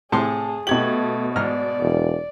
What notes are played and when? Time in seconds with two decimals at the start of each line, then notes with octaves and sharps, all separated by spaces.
0.12 A2 C3 G#4 A5 C6
0.67 B2 A3 G4 G#6 F#7
1.36 G#2 D5 A#5 F6
1.81 E1